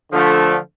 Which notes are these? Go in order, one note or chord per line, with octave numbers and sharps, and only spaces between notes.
D3 F3 A3